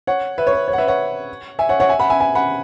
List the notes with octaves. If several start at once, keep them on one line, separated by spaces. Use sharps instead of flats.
C#5 F#5
B4 E5
C#5
B4
C#5
F#5
B4 E5
C#5 F#5
E5 G#5
C#5 F#5
C#5 F#5
E5 G#5
F#5 B5
E5 G#5
E5 G#5
F#5 B5